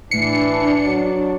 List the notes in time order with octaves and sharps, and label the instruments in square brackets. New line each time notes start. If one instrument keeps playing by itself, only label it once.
[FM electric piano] A2 C7 [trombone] E3 [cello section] D4 [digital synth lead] C#7
[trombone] F#3